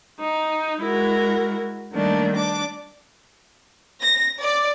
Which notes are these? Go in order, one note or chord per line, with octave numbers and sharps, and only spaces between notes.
D#4
G#3 E4 F#4 A#4
D#3 G3 A3 A#3 D4
D4 D6
A#6
D5